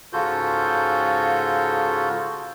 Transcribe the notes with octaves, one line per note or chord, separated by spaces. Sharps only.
G#2 C#3 F4 F#4 A4 G6